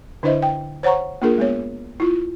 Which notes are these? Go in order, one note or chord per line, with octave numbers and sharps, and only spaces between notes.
D3 D4 E4 C5 D#5 E5
G5
C5 C#5 F#5 A#5 C#6
A#3 D4 F4 G#4 A#4
G#3 B3 C#5
E4 F4